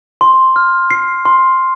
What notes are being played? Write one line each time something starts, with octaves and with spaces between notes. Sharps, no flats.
C6
F6
C7
C6